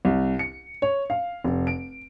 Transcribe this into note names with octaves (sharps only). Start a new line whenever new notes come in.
C2
C#7
C#5
F5
F1
D7